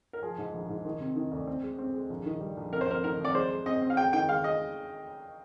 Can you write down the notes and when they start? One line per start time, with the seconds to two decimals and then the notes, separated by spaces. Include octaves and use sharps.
0.13 A#4
0.22 F3 G#4
0.38 G#2
0.53 A#1
0.69 G#2
0.85 D#3
1.00 C3
1.16 D#3
1.32 D2
1.47 C4
1.63 G#3
1.78 C4
1.94 G#3
2.10 A#1
2.26 D#3
2.41 G3
2.57 A#1
2.72 F2 A#4
2.81 C5
2.88 F2 A#4
3.04 D#3 A#4
3.19 F2
3.25 D5
3.35 G#3 C5
3.51 G#3
3.66 C4 D#5
3.82 C4
3.90 F5
3.97 G#3 G5
4.13 D#3 G5
4.29 G#3 F5
4.44 G#3 D#5